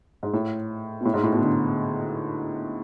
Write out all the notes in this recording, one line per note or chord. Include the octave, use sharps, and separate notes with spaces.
G#2
A2
B2
A2
G#2
A2
B2
D3